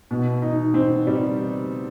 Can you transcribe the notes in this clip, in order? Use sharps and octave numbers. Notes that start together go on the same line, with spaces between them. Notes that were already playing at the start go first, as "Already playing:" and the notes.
B2
D#4
C4
G3